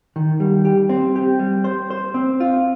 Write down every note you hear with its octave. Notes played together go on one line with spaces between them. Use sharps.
D#3
G3
G4
C4
G4
G3
C5
C5
C4
F4